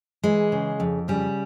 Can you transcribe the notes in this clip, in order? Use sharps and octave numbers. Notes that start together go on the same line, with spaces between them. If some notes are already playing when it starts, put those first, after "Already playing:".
E3 G#3
C#3
F2
C#3 G3